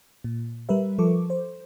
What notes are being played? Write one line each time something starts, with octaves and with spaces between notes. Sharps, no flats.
A#2
G3 A#4 B4 E5
F3 A4 C#6 D6
C5